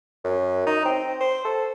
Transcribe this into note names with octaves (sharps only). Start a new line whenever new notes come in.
F#2
D#4
C4
C5
A4